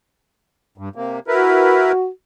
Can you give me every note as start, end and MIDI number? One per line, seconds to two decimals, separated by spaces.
0.78 0.89 43
0.96 1.19 48
0.96 1.19 58
1.28 1.92 64
1.28 2.08 66
1.28 1.92 70
1.28 1.92 71